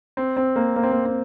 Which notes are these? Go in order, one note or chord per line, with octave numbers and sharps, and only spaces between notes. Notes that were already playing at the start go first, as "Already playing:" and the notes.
C4
C4
A#3
A#3
C4
A#3
C4